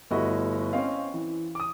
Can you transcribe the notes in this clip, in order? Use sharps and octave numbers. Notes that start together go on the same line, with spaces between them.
G1 A3 E4 F#4 D#5
C4 C#4 D#5 F5
E3
D6 D#6